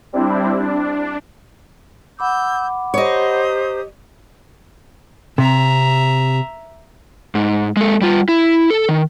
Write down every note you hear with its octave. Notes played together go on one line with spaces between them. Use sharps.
G3 C4 D4 E4
D4
F#5 B5 D6 E6 G6
G4 C5 C#5 D#5 A#5 D#6
C3 E5 A#5
G#2
G#3 A4
G3 F4
E4
A4
D#3